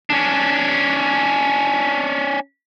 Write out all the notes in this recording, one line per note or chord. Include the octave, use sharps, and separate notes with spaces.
C#4 D4